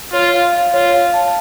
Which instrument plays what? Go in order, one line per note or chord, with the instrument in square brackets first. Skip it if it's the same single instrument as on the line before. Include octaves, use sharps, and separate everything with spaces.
[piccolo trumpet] F4 [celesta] C#5
[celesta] F5
F5
[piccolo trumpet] F4 [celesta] C#5
[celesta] F5
A5